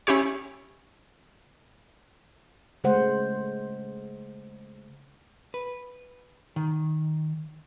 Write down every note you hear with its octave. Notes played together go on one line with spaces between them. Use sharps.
C#4 E4 G4 C#5
C#3 G#3 A3 C5 F#5
B4
D#3